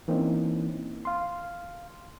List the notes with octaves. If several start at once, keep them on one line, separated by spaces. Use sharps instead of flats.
E3 A#3 C4 C#4 D#4 E4
F5 C6